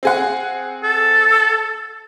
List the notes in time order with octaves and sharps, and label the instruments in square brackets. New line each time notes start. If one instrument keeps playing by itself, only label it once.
[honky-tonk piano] C4 G#4 F#5
[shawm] A4